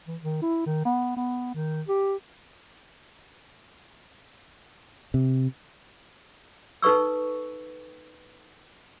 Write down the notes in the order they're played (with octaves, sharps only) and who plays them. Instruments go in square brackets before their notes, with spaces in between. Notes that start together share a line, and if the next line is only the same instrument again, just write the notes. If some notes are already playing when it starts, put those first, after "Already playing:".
[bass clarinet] E3
D#3
E4
D#3
B3
B3
D#3
G4
[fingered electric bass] C3
[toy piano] D#4 A4 B4 C#6 E6